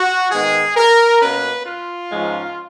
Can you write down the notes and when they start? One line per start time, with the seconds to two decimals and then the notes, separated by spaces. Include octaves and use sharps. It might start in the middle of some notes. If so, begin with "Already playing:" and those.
Already playing: F#4
0.31 G#2 D#3 G#3 B3 G#4
0.77 A#4
1.21 B2 A#3 C#4 B4
1.65 F4
2.11 G#2 F3 G#3 C#4